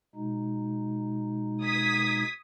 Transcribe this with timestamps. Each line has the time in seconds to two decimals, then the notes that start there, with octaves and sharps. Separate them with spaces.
0.15 B2 G#3 D#4
1.63 D#6 G#6 B6